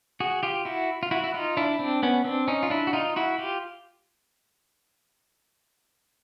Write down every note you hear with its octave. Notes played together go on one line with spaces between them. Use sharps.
F#4 G#4
F4 G4
E4 F#4
F4
E4 F#4
E4
D#4 F4
D4 E4
C4 D4
B3 C#4
C4 D4
C#4 D#4
F4
D4 E4
F#4
D#4 F4
E4 F#4
F4 G4